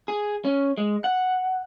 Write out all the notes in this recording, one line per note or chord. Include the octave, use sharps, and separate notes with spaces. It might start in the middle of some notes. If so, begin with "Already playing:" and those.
G#4
C#4
G#3
F#5